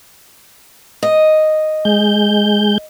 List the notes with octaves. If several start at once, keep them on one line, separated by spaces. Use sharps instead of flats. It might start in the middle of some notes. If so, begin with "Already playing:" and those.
D#5
G#3 G6